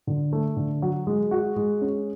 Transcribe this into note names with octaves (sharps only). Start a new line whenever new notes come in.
D3
A3
D3
F#3
G#3
F#4
G#3
C#4